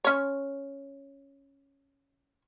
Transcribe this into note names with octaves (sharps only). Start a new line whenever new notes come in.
C#4 C#5